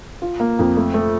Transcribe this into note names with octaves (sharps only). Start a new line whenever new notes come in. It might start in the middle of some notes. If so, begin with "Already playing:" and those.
F4
A#3
F2
A3
A3